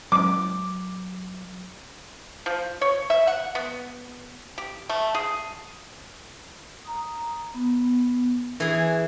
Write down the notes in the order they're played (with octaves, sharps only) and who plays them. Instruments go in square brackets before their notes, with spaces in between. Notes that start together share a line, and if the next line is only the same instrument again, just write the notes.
[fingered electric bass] F#3 [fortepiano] D6
[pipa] F3
C#5
E5
F#5
B3
G4
A3
G#4
[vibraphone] A#5 D#6
B3
[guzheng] E3 G#4 [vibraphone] G#5